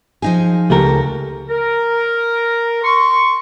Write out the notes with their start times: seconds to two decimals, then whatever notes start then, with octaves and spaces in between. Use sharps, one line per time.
0.22 F3 D#4 G#4
0.70 C#2 A3 G4 A4 A#4
1.49 A#4
2.83 C6 C#6